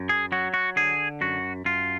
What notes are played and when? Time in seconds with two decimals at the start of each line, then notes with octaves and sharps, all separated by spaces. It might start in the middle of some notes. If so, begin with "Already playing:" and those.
Already playing: F#2
0.09 G#4
0.32 F#3 F#4
0.54 F#4
0.76 D3 G#4
1.21 F#2 F#4
1.65 F#2 F4